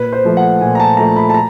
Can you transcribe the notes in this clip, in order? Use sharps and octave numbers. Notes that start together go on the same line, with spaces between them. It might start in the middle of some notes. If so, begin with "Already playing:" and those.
Already playing: A#2 B4
C5
F3 A3
F#5
A#2 G#5
A#5
A5
F3 A3 A#5
B5
A5
A#5